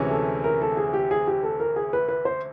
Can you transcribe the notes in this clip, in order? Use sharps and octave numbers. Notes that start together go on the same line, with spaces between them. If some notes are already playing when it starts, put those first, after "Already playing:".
Already playing: D2 C3 E3 G#3 C#4
A4
A#4
A4
G#4
G4
G#4
G4
A4
A#4
G#4
B4
B4
C5